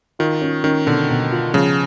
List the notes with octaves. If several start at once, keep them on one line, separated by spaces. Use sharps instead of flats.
D#3 F4
C#4
D#3 C#4
B2 D3
B2
F4
C#3 F3